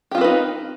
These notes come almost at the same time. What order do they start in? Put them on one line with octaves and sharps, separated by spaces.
G4 F4 C4 B4 D#4